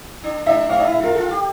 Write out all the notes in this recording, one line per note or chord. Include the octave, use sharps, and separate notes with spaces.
D4
D4 E5
C4 F5
D4
E5
E4
E5
F4 A#4
F4 A4
G4